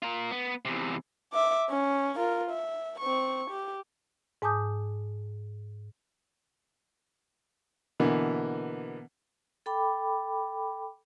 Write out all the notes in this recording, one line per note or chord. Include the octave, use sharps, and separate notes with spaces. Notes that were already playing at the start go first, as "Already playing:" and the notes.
F4 A#4
B3
E2 C3
E5 D6
C#4
F4 A#4
E5
C4 C#6
G4
G#2 G#5 A5 D6 D#6 G6
B2 D3 E3 A#3 B3
A4 G5 B5 D6